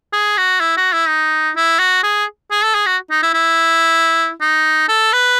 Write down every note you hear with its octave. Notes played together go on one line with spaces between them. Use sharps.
G#4
F#4
E4
F#4
E4
D#4
E4
F#4
G#4
G#4
A4
G#4
F#4
D#4
E4
E4
D#4
A4
B4